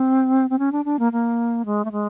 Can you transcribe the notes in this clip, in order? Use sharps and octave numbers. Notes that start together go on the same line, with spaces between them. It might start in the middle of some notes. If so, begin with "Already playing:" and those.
Already playing: C4
C4
C#4
D4
D4
A#3
A#3
G#3
A3
G#3